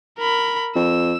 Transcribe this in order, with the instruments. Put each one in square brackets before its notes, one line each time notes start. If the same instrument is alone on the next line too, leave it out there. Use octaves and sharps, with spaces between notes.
[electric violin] A#4 B5
[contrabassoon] F2 [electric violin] E6